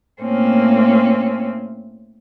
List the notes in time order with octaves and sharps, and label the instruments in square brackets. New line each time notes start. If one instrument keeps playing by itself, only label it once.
[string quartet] A2 A#3 C4 C#4